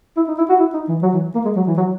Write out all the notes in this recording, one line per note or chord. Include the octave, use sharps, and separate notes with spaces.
E4
D#4
E4
F#4
E4
D#4
E3
F#3
E3
A#3
G#3
F#3
E3
F#3